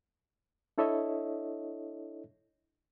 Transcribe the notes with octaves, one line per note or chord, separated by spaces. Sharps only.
D4 E4 A4 C#5 D#5 E5